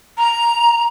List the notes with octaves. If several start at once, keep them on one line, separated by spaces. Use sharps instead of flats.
A#5